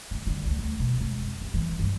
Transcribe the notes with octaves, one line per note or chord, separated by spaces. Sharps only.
D3
D3
D2
D2
B2
G#3
F2
D#2
E3
G2